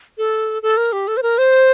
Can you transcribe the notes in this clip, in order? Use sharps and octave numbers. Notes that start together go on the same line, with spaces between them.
A4
A4
A#4
G4
A4
C5
A#4
C5